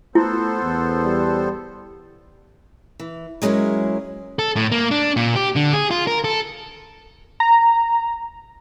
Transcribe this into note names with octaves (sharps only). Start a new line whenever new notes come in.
A3 B3 E4 A4 C5
E2
G3
E3
F#3 G#3 C#4 E4 A#4
A4
A2
A#3
D4
A#2
G4
D3
G#4
F4
A#4
A4
A#5